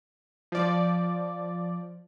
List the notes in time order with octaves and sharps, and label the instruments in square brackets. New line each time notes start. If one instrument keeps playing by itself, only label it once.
[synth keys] F3 D5